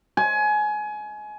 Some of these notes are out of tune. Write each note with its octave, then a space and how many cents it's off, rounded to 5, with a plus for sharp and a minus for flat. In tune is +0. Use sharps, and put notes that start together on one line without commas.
G#5 +25